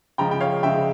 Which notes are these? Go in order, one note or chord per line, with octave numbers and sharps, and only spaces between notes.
C#3 F3 G#3 G5 A#5
G5
C#5 F5
C#3 F3 G#3 E5 G5